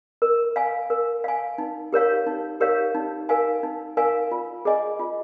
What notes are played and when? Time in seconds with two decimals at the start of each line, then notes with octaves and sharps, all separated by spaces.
0.22 A#4
0.56 F5 G#5
0.90 A#4
1.24 F5 G#5
1.58 D#4
1.93 G4 A#4 C#5 F5
2.27 D#4
2.61 G4 A#4 C#5 F5
2.95 D#4
3.29 A#4 F5 G#5
3.63 D#4
3.97 A#4 F5 G#5
4.31 F4
4.65 G#4 D#5 G#5
4.99 F4